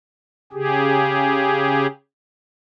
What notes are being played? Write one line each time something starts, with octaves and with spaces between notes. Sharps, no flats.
C#3 G4 G#4